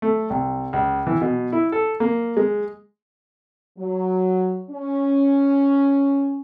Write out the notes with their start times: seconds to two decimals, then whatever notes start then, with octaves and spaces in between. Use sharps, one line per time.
0.02 A3
0.30 C2
0.73 C#2
1.07 E3
1.21 B2
1.52 E4
1.72 A4
2.00 A#3
2.37 G#3
3.78 F#3
4.70 C#4